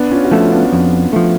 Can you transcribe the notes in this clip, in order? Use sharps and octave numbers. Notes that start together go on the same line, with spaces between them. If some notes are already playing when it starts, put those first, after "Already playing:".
Already playing: B3 D4
C#4 F4
F#4
F3 A3 C#4 F4
B3 D4
F2
F3 A3